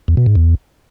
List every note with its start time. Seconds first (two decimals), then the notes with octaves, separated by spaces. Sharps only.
0.08 E2
0.17 B2
0.26 G#2
0.36 E2